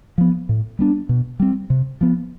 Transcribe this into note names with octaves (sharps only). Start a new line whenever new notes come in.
F3 B3
A2
G3 B3 D4
B2
G3 C4
C3
F3 B3